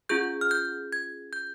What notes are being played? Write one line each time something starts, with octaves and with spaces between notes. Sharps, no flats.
C#4 F4 G#4 G6
F6
G6
G#6
G6